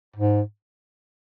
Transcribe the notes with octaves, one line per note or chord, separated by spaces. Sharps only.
G#2